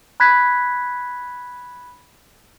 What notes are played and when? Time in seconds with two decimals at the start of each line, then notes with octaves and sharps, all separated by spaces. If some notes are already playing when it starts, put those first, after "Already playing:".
0.20 B5 F#6 G#6 B6